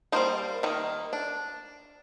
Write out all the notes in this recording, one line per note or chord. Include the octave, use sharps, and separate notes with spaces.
G3 A#3 D#4 C5
D#3 G3 A#3
D4